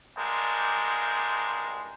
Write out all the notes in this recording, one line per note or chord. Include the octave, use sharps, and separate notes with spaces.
C2 G2 G#3 D4 A#4 C5